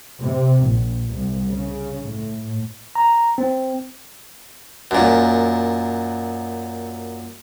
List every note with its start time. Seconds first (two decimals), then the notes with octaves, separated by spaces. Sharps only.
0.22 C3
0.64 A#1
1.12 C2
1.49 C#3
2.08 A2
2.95 A#5
3.38 C4
4.91 F#2 A#2